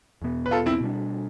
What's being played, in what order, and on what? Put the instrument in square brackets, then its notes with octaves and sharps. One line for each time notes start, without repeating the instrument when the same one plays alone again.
[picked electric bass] E2 B2 B3
[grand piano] B4
F4 A4
C4 E4
[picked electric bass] B2 G3 D4